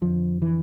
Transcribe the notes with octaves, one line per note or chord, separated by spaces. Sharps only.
F2 D3 F3
E3